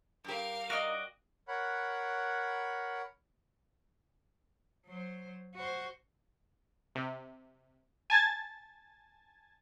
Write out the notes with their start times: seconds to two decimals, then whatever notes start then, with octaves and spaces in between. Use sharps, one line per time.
0.24 G2 G4 A#4 F5
0.70 D#4 F#4 D5 D#5 F6
1.48 A#4 C#5 F#5 B5 F#6
4.86 F#3 C5
5.55 F#4 C5
6.95 C3
8.10 G#5 A5 G#6 A6